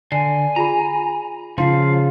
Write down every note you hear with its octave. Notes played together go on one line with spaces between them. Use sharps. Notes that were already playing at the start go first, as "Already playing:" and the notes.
D3 G#5 C7
F4 G#4 A#5 B5
C#3 F3 F4 F5 C6